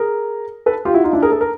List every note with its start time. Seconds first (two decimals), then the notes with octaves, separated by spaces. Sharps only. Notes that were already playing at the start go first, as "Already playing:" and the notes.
Already playing: G#4 A#4
0.66 A4 B4
0.85 F4 G4
0.94 E4 F#4
1.04 D#4 F4
1.13 D4 E4
1.22 G#4 A#4
1.32 A4
1.41 A#4